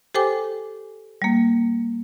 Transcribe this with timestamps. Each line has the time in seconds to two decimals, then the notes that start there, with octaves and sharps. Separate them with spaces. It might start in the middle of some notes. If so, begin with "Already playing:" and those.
0.14 G4 A4 C5 G5 G#5 D6
1.22 G3 A#3